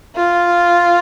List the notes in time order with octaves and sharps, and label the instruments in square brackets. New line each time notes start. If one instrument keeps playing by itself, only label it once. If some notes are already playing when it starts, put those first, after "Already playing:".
[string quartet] F4